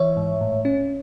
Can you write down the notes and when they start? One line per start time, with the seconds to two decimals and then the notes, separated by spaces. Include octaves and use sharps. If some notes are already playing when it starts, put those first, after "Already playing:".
Already playing: E3 C#5 E5
0.17 G#2
0.41 A2
0.65 C#4